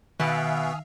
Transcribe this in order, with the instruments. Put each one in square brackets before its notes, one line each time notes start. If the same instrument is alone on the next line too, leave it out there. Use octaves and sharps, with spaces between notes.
[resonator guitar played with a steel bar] B2 B3 [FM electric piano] D#3 [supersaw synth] E5 F5 [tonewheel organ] G#5 D#6 F6